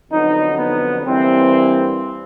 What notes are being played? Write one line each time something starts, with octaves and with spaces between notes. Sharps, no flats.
F2 D3 F#3 B3 D#4
B3
G2 E3 G3 A#3 C4